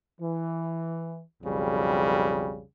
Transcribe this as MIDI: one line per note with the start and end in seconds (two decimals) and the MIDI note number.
0.20 1.21 52
1.43 2.63 35
1.43 2.63 41
1.43 2.63 49
1.43 2.63 55